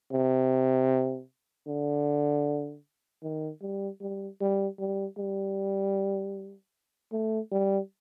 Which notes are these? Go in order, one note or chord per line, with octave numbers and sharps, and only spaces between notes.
C3
D3
D#3
G3
G3
G3
G3
G3
A3
G3